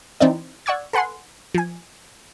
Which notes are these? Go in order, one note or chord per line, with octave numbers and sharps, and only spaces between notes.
E3 C4 D#4 E4 D5
D5 F#5 C#6 E6 G#6
A4 B4 F#5 G#5 C6
F3 G#5